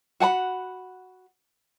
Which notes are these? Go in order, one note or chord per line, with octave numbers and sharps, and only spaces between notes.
F#4 F#5 G#5 B5